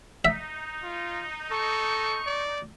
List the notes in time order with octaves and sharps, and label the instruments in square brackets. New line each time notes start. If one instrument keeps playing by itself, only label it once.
[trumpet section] D#4 [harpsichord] E5
[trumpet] F4
[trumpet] A4 [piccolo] C#6
[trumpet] D5